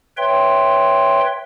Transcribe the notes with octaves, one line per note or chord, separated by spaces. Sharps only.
B4 C#5 E5 G5 C6